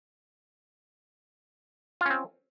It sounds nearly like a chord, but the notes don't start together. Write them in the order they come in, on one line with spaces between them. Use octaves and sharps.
F4 C#4 C4